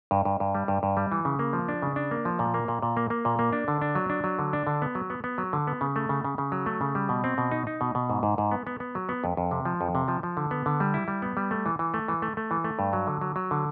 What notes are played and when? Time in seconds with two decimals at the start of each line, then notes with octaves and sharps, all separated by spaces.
0.11 G2
0.25 G2
0.40 G2
0.55 G3
0.68 G2
0.83 G2
0.97 G3
1.12 E3
1.25 C#3
1.39 A#3
1.53 F3
1.68 D4
1.82 C#3
1.96 D4
2.11 A#3
2.25 F3
2.39 A#2
2.54 A#3
2.68 A#2
2.82 A#2
2.97 A#3
3.10 A#3
3.25 A#2
3.39 A#3
3.53 D4
3.68 D3
3.82 D4
3.95 F#3
4.10 D4
4.24 F#3
4.39 D3
4.53 D4
4.67 D3
4.82 B3
4.95 F#3
5.10 B3
5.24 B3
5.38 F#3
5.53 D3
5.67 B3
5.81 C#3
5.96 A3
6.09 C#3
6.24 C#3
6.38 C#3
6.52 F#3
6.66 A3
6.81 C#3
6.95 G3
7.09 B2
7.24 C4
7.38 B2
7.52 D#4
7.67 D#4
7.81 B2
7.95 B2
8.10 G#2
8.23 G#2
8.38 G#2
8.51 B3
8.67 B3
8.80 B3
8.95 F#3
9.09 B3
9.24 F2
9.37 F2
9.51 C3
9.65 F3
9.81 F2
9.95 C3
10.08 F3
10.23 F3
10.37 D3
10.51 B3
10.66 D3
10.80 G3
10.94 E4
11.08 G3
11.22 B3
11.37 G3
11.51 A3
11.66 E3
11.79 E3
11.94 A3
12.08 E3
12.22 A3
12.37 A3
12.51 E3
12.64 A3
12.79 G2
12.93 F#3
13.07 D3
13.21 F#3
13.36 F#3
13.51 D3